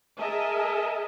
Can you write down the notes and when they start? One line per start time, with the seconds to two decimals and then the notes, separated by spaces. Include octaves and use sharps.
0.18 G#4 A#4 D#5 E5 G#5 A5